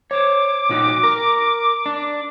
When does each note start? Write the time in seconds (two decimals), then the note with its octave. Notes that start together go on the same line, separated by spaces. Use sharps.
0.11 C5 C#5 D6
0.69 A#2 D#4 F#4
1.03 A#4
1.86 D4